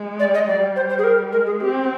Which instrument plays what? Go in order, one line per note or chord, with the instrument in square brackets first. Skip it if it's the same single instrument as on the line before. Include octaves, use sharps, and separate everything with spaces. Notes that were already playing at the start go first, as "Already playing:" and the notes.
Already playing: [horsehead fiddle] G#3
[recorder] D5
D#5
[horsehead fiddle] G3 [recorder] D5
[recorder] C5
C5
G#4
A#4
[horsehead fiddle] G#3 [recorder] A#4
[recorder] G#4
[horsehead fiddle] C4 [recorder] G4